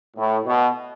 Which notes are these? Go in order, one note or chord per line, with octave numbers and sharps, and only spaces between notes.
A2
B2